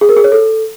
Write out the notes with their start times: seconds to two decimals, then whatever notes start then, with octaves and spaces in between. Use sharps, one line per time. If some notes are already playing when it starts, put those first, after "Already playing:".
0.01 G#4
0.09 A#4
0.17 G#4
0.24 C#5
0.32 A4